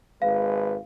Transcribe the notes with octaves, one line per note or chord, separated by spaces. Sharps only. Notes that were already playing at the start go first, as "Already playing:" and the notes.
G#1 G#3 B4 F5